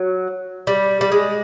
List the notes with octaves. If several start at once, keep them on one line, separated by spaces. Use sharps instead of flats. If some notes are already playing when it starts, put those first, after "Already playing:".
Already playing: F#3
G3
G3
G#3